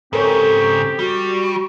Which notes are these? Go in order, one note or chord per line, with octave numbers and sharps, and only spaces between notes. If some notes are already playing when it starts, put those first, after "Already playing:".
G#2 C#3 C4 G4 A4 A#4 C#5
G3 F#4